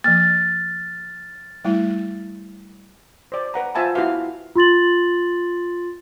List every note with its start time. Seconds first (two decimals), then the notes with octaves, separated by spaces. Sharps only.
0.04 F3 A#3 F6 A6
1.65 G3 A3 E4
3.32 C5 D5
3.54 B4 F#5 A#5
3.75 F4 C5 E5 G#5 A5 B5
3.95 E4 F#4 B4 F5
4.56 F4 C6 A6 F#7